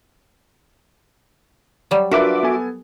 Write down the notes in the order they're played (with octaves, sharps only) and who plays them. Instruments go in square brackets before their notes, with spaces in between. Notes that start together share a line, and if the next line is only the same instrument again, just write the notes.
[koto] F#3 G3
[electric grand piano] D4 F4 B4 [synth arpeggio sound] F#4 E5 D6 [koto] A#4
[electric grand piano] B3 A4 G#5